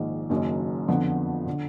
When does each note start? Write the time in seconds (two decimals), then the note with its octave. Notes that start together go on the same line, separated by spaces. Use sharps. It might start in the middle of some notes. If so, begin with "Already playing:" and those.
Already playing: A#1 G#2 D#3
0.30 F#1 F#2 D#3
0.88 F2 D3 F3 B3
1.47 D3